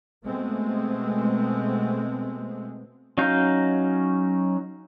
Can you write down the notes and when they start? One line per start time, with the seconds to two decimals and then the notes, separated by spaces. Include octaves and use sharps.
0.24 B2 G#3 A3 B3 C4
3.18 F#3 C#4 D#4 F5 G6